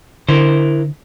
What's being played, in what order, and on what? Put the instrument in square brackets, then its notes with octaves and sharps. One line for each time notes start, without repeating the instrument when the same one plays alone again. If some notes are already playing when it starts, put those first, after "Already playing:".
[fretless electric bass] D3 [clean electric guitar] E4 A#4 C5